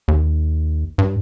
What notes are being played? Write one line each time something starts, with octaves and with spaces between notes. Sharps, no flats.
D#2
G2